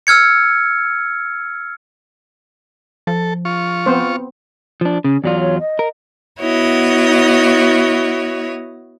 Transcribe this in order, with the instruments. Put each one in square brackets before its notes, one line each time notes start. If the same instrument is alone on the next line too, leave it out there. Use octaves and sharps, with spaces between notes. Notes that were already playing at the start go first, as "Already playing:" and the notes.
[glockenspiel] E6 F6 G#6 C#7
[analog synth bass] F3 [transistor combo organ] A4
[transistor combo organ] F4 C#6
[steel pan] B3 C4 C5
[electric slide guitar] F3 D4
[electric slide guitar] C#3 [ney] C#4
[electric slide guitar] E2 F#3 F4 [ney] D5
[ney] C#5
D#5
[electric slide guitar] A#4
[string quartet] B3 E4 F#4 C#5 D#5